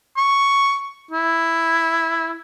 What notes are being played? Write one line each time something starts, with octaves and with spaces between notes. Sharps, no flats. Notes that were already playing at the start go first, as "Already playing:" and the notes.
C#6
E4